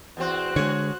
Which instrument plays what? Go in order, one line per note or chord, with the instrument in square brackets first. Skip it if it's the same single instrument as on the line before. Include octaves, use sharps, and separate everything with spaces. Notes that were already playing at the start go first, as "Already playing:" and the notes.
[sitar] E2 C4 [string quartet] F#4 C5 F#6
[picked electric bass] D3 G#3 [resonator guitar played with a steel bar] G#4 C#5